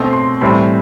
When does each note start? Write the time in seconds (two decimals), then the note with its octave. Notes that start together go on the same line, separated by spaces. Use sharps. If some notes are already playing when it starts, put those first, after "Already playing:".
Already playing: B2 A3 C4 C6
0.13 C6
0.41 A2 E3 G3 C4 B5